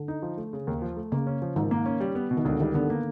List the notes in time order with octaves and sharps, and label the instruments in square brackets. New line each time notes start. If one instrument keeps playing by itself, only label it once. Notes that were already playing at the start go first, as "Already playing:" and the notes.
Already playing: [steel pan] D3
[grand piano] D#4
F3
A3
C#3
D#2
F3
A3
[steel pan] C#3 [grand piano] A#3
[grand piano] C#4
F3
[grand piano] G#2 [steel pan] D#3
[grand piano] A#3
C#4
G3
B3
B2
[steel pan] D#3
[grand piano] C#2 [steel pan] D3
[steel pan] D#3 [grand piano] G3
[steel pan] D3 [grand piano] B3
[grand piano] A#3